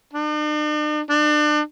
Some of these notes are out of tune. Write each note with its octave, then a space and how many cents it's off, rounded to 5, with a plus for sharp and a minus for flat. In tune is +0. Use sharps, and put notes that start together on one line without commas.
D4 +45
D4 +35